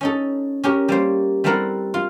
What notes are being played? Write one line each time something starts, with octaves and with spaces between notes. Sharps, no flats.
C#4 D#4 A4
C#4 G4 A#4
G3 A#3 C5
G3 A3 C4 E4 A#4 F#5
F4